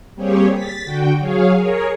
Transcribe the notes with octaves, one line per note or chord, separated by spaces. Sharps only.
G3 A#3 C4 G4 G#4 C#5
A6 B6
D3 F#4 G5
F#3 G#4 C#5 F5
G#4 A#4 C#5